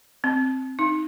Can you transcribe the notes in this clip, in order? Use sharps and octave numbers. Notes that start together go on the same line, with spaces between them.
C4
D#4